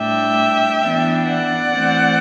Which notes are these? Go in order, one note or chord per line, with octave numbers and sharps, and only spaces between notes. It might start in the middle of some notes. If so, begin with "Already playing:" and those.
Already playing: A2 G3 D4 E5 G5
E3 B3 D4
D5 F#5
E3 A3 C4